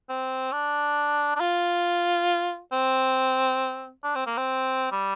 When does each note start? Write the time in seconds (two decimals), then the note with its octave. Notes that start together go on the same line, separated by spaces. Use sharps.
0.09 C4
0.52 D4
1.36 D4
1.40 F4
2.73 C4
4.04 D4
4.15 C4
4.26 A#3
4.37 C4
4.92 G3